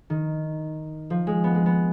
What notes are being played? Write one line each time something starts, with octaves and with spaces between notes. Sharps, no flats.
D#3
F3
G#3
B3
G#3
B3